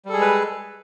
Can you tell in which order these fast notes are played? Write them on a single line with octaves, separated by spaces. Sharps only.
G3 A4 G#4 G#3 B4